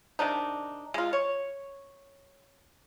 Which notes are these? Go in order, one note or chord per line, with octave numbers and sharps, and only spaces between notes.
C3 D#3 D4 D#4
G#3 F4
C#5